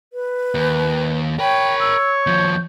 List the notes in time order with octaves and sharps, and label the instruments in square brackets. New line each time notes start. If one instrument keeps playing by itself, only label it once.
[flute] B4
[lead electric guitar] D#2
[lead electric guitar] A#4 B5 [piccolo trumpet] C#5 [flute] G5
[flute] E6
[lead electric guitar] D#2 F3 [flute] G6